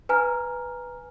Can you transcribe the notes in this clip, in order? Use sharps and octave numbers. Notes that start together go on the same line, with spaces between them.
B4 G#5 A#5 F6